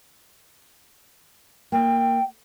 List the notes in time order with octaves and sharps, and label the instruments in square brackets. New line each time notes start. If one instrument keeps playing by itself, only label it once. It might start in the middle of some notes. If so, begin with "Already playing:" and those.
[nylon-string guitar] A#3 [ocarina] G5